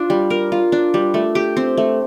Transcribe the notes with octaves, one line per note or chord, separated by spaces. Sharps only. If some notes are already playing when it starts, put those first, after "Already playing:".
Already playing: D4 F4
G3
A#4
F4
D4
G3
A3
G4
C4
A3